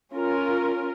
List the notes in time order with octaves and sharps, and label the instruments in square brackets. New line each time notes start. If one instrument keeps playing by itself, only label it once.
[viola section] C#4 F4 A#4